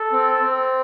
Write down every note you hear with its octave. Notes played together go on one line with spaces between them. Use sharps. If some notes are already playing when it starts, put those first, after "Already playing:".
Already playing: A4
C4
C4